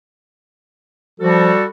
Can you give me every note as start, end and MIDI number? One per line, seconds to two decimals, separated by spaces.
1.20 1.52 53
1.20 1.64 55
1.20 1.64 66
1.20 1.64 69